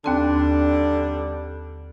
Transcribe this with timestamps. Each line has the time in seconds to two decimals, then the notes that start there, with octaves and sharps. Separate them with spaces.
0.04 D#2 D3 G3 C4 D4 A5